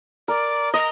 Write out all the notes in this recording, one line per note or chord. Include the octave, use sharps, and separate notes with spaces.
A#4 D5
D#5 A#5